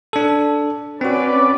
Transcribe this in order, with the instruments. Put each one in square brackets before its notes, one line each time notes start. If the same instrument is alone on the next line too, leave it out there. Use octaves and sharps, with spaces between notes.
[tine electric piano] D4 A4
[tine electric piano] C4 F#4 [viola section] C#4 B4 D5